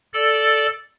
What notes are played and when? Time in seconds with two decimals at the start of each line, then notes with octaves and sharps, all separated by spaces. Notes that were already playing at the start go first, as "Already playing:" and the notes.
0.14 A4 D5